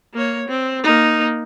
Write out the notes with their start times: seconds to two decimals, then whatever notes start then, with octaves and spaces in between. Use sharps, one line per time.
0.14 A#3 C#5
0.48 C4
0.83 A#3 D#4